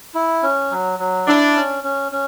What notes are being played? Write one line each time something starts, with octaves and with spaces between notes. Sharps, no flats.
E4
C#4
F#3
F#3
D4 E4
C#4
C#4
C#4